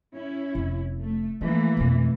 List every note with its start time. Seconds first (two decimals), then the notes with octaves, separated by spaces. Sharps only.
0.14 C#4 E4
0.55 F1
1.01 A3
1.41 E3 F3 A3 A#3
1.77 F2 B2